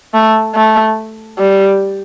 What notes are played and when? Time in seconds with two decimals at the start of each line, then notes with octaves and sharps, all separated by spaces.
0.14 A3
0.55 A3
1.38 G3